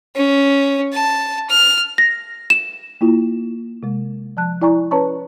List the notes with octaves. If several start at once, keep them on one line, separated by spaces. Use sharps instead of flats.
C#4
A5
F6
A#6
E7
A#3 E4 F4
C3 G#3
F3 A5 F#6
E4 D5 G#5 A#5 C#6
C#4 B4 C#5 A5 A#5 C#6